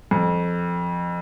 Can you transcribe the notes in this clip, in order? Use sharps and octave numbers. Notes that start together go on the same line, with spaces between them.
F2